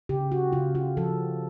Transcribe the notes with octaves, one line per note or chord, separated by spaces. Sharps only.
C#3 G4
F#4
C#3 F4
F4
F3 A4